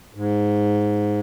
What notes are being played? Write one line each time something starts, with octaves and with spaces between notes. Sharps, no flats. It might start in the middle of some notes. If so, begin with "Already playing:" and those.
G#2